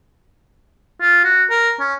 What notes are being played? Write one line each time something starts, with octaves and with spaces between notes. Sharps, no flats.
F4
F#4
A#4
C#4